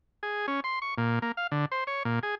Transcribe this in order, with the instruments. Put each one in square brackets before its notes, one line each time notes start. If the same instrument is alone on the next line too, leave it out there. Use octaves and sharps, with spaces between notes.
[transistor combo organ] G#4
C#4
C6
C#6
A#2
A#3
F5
D3
C5
C#5
A#2
G#4